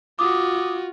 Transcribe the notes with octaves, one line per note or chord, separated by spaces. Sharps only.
F4 F#4 D6 D#6